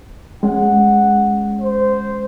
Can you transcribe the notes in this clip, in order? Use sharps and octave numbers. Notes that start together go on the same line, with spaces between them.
G#3 C#4 F#5
C5